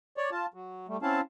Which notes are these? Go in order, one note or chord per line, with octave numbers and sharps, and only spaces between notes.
C#5 D5
F4 A5
F#3
G3 A3
C4 C#4 E4 F5 A5